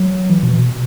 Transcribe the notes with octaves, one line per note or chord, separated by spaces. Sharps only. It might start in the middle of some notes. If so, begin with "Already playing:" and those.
Already playing: F#3
E3
B2
B2